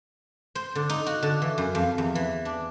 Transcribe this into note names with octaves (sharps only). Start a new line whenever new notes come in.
C5
D3
D#4
F#4
D3
E3
F#2
F2
E2
E3
D4